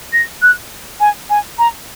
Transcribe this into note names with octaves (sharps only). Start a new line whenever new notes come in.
A#6
F#6
G#5
G#5
A#5